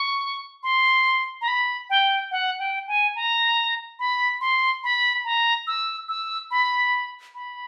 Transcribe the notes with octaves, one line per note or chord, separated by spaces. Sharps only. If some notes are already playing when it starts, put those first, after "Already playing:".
Already playing: C#6
C6
A#5
B5
G5
F#5
G5
G#5
A#5
B5
C6
B5
A#5
E6
E6
B5
B5